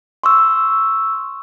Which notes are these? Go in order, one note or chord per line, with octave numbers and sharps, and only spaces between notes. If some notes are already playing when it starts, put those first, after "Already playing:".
C6 C#6 E6